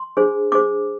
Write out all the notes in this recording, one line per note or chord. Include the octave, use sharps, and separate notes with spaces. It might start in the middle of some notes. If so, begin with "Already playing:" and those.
Already playing: C6
D4 G#4 C5
D4 G#4 C5 D6